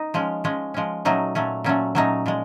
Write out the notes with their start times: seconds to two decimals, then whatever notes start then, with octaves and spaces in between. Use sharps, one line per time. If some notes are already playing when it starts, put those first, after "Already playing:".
Already playing: D#4
0.14 F3 G#3 C#4
0.44 F3 G#3 C#4
0.74 F3 G#3 C#4
1.05 A#2 F#3 A3 C#4 D#4
1.35 A#2 F#3 A3 C#4
1.64 A#2 F#3 A3 C#4
1.95 A#2 F#3 A3 C#4 D#4
2.26 A#2 F3 G#3